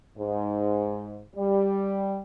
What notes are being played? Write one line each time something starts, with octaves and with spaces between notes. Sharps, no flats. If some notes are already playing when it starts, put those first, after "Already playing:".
G#2
G3